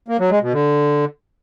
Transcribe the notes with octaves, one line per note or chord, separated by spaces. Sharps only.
A#3
F#3
G#3
B2
D3